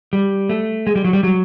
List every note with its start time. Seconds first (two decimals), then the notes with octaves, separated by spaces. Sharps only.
0.13 G3
0.49 A3
0.87 G#3
0.96 G3
1.04 F#3
1.13 G3
1.23 F#3